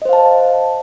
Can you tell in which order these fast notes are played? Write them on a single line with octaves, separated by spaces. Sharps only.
D#5 C5 F5 A5